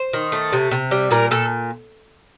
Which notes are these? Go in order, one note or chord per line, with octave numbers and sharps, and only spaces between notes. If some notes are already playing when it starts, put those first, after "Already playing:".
Already playing: C5
D#3
A3
C3
C3
G3
A#2 A#4
A#2 A4